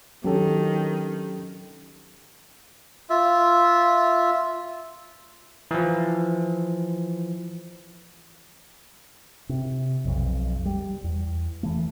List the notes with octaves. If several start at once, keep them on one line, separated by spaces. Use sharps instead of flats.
D#3 F#3 C#4 D4 G4 A4
F4 E5
E3 F3
C3
B1 F2
G3
E2
E3 A3